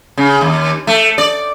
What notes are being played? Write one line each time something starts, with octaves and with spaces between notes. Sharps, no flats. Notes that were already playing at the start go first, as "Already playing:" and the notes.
C#3
D#2
A3
D5